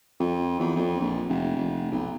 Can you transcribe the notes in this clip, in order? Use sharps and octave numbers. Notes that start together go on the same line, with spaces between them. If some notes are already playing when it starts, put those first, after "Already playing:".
F2
E2
F2
A#1
F1
F1
B1